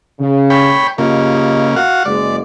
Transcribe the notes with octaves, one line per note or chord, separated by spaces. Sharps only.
C#3
C#5 G5 B5
C#3 A#3 F4 G4 D#5
F#4 F5 F#5
F#1 G#3 D5